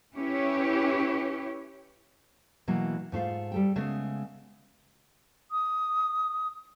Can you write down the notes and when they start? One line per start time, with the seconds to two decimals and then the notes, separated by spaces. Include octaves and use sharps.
0.16 C#4 E4 G4 B4 C#5
2.67 B2 E3 F#3 A#3
3.12 G#2 A3 F4 F5
3.52 G3 A4 G5
3.76 C#3 G#3 A3 B3
5.51 D#6